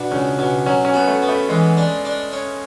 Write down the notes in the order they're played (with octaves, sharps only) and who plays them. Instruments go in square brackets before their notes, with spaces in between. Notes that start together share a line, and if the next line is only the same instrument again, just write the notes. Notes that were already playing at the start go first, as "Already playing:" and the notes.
Already playing: [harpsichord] B2 [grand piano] D4
[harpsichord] C#2 [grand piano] C#4
[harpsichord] B2 [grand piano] C#4
[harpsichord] F#3 [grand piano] C#4
[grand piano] C#4
[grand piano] B3 [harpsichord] F#4
[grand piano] A3
[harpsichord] B3
[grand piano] A3
[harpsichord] E3 [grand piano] G#3
[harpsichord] D4
D4
C#4